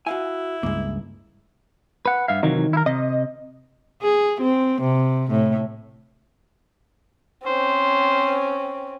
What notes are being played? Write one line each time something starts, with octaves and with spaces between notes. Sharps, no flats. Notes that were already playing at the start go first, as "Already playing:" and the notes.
E4 F#4 F5 G#5
C#2 G2 G#3 A#3
B4 F#5
G2 E5 F5
C3 D#3 E3 F#3
E4 A#4
C3 D#5
G#4
C4
C3
A2
C4 C#4 C5